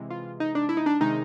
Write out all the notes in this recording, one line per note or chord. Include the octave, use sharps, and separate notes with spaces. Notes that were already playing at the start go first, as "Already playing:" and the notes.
Already playing: C3 E3 G#3
F4
D#4
D4
E4
D#4
D4
C3 D#3 G#3 D#4